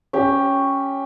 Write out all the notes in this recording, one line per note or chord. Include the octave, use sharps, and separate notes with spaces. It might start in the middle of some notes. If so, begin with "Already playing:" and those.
C#4 G4